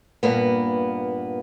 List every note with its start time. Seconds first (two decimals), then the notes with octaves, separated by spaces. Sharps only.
0.23 G2 A#2 A#3 B3